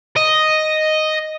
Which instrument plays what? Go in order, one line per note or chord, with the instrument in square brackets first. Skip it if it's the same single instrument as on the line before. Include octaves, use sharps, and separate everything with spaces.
[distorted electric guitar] D#5